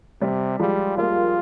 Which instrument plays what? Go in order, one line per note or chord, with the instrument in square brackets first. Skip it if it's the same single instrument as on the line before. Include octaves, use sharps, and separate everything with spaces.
[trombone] C3 [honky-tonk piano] G3
[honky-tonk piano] F3 G#3 [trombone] G3
[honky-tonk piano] G3 A#3 [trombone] F4